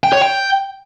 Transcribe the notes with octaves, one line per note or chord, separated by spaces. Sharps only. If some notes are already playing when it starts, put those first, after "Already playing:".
G5
C#5
G5